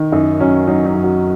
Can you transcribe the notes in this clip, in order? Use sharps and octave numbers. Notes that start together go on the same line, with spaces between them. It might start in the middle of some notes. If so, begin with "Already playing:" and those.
Already playing: D#3
F#2 D#4
F#3 C#4
F#3 D#4
D#4
F#2
F#4